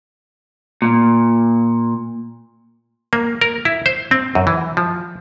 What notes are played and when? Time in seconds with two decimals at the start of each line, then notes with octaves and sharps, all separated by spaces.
0.82 A#2
3.13 A#3
3.41 A#4
3.65 E4
3.86 C5
4.11 C4
4.35 F#2
4.47 E3
4.77 F3